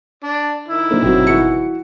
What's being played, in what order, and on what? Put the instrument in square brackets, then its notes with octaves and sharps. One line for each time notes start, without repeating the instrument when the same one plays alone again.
[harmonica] D4
D#3 E4
[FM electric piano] F#3 D4 C5 [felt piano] A#3
[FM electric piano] G1 B2 [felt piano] F#3 C4
[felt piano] E3 F#4 C#7